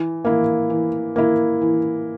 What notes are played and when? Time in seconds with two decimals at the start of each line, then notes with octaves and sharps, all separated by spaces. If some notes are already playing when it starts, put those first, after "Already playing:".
Already playing: E3
0.25 A#3 E4
0.70 E3
1.16 A#3 E4
1.62 E3